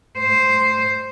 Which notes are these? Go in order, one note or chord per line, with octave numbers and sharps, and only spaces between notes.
C5